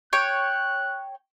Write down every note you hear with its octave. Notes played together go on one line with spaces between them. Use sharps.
C#5 G5 F#6